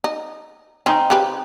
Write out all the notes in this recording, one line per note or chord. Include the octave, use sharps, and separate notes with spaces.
D#4
D#3 C4 C#4 D#4
C#3 G4 B4